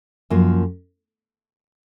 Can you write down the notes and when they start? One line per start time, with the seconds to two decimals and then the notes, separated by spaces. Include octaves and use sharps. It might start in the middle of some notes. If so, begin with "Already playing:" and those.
0.30 F#2 F3 A#3